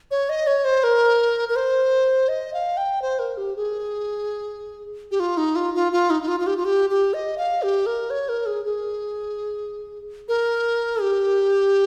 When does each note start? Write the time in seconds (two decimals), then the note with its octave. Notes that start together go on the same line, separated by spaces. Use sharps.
0.11 C#5
0.29 D#5
0.47 C#5
0.65 C5
0.84 A#4
1.49 A#4
1.56 C5
2.28 D#5
2.54 F5
2.77 G5
3.02 C5
3.19 A#4
3.37 G4
3.56 G#4
5.11 G4
5.20 F4
5.37 D#4
5.56 F4
5.75 F4
5.92 F4
6.10 D#4
6.23 D#4
6.28 F4
6.40 F4
6.47 G4
6.57 F4
6.65 G4
6.90 G4
7.14 D#5
7.38 F5
7.62 G4
7.86 A#4
8.10 C#5
8.29 A#4
8.46 G#4
8.65 G#4
10.28 A#4
11.01 G4